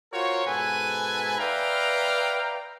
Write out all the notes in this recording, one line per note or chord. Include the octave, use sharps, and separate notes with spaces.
F4 F#4 A#4 C5 C#5
G#2 B2 A4 B4 G#5
B4 D5 E5 F5 G5 A#5